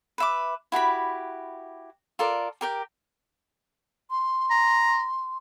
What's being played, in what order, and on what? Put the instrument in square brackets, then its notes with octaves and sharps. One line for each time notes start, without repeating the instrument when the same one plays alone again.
[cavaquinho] B4 E5 D6
E4 F#4 G4 B5
F4 A4 A#4 D5
G4 A#4 G5
[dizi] C6
[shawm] A#5